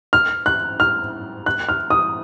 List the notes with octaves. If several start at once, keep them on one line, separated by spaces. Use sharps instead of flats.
F6
F#6
F6
F#6
F6
D#6